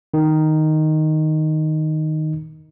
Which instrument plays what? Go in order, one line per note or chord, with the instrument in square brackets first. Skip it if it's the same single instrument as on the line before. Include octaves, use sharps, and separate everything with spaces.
[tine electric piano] D#3 D#4